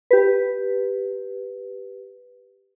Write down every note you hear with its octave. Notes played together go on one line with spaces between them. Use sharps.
G4 B4